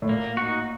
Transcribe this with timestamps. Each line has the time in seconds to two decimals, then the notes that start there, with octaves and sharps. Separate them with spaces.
0.02 A2
0.09 A#2 A#3
0.37 D#4 F#4